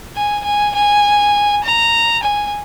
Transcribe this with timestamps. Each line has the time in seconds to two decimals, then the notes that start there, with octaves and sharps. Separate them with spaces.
0.16 G#5
0.45 G#5
0.75 G#5
1.64 A#5
2.23 G#5